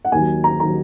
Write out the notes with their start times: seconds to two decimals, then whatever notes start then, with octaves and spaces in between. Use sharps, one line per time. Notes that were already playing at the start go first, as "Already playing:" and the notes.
0.05 F#5
0.12 D#2 D#3 F#3 G#5
0.44 A#5
0.60 D#3 F#3 A#5